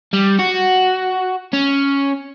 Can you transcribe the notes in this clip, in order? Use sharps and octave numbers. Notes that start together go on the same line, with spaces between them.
G3
F#4
C#4